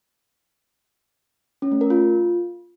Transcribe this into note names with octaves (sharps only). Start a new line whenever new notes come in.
C#4
A3
A#4
F4